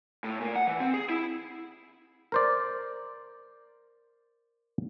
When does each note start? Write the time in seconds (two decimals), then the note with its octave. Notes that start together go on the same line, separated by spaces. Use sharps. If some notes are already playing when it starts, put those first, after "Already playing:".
0.24 A2
0.40 A#2
0.56 F#5
0.67 E3
0.80 C4
0.94 G#4
1.09 E4
2.32 A#4 C5 D5